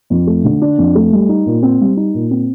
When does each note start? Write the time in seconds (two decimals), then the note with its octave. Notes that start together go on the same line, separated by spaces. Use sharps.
0.10 F2
0.27 A3
0.44 D3
0.62 D4
0.78 F2
0.95 A3
1.12 G3
1.29 D#4
1.46 A#2
1.63 C4
1.80 G3
1.97 D#4
2.14 A#2
2.31 C4